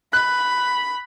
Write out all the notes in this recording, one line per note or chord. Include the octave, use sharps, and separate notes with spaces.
B5 F#6